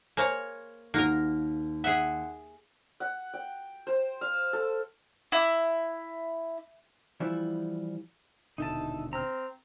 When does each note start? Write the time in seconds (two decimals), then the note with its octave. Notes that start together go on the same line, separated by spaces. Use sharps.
0.17 A#3 G#4 C5 C#5
0.94 D#2 A#3 F#4 A#4
1.84 G#4 E5 F#5
3.00 F#5
3.34 G5
3.87 C5
4.21 F5
4.53 A4
5.32 E4
7.20 E3 F3 G3 E4
8.58 D#1 B2 D3 D#4 E4 A5
9.13 C4 A#5 F6